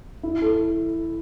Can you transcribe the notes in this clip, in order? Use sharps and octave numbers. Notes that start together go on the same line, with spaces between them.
E4
A4